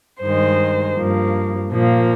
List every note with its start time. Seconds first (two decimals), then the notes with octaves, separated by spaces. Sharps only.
0.23 G2 D#3 G#3 C5
0.97 G2 F3 A#3
1.71 A#2 F3 A#3